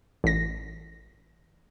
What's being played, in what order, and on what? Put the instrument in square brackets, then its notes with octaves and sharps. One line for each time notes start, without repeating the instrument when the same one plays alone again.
[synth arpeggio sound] A1 A#6